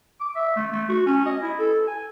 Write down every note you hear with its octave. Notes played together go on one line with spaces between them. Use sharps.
D6
E5
A3
A3
F#4
C#4
D#5
E4
A4
G#5